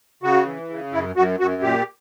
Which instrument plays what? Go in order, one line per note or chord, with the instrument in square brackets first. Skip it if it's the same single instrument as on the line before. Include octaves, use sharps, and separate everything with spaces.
[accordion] C#3 F#4
E3
C#3
F#2 E4
F#2 F#4
F#2 F#4
A#2 G4